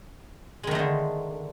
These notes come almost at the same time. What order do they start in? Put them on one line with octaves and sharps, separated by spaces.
G#3 D#3 A3 D#4 D3